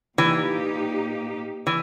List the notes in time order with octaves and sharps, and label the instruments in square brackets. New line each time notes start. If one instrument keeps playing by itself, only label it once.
[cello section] A#2 A#3 D#4 G4 [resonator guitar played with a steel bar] E3
[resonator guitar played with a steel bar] E3